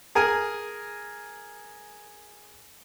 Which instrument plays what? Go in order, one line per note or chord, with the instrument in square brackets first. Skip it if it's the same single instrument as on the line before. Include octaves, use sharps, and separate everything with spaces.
[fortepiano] G#4 A#4 G#5